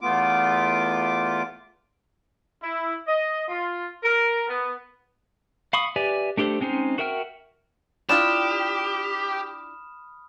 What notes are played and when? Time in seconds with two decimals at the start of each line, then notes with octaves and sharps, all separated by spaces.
0.01 E2 A3 B3 F4 D6
2.62 E4
3.06 D#5
3.48 F4
4.02 A#4
4.48 B3
5.73 F5 B5 C#6 D#6
5.96 G4 B4 D5 E5 G#5
6.37 A3 D4 G4 A4 C5
6.60 G#3 C4 C#4 D#4 C5
6.98 F#4 A#4 E5 G5 F6
8.09 D4 E4 F4 G4 B5 D#6 F6 E7